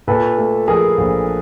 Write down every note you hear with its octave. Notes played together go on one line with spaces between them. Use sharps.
A#2 A4 B4
A3
F3 G#4 A#4
A#1